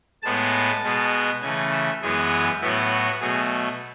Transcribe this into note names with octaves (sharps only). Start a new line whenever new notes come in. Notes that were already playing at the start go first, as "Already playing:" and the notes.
A2 G#3 B3 A5
B2 G#3 B3
C#3 E3 A3 G#5
E5
F#2 E3 G#3 B3 G#4
A2 F#3 B3 E4
F#4
B2 F#3 A3 G#4